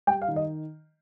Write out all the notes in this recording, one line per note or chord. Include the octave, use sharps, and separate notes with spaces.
G3 G5
F5
D#3
D#5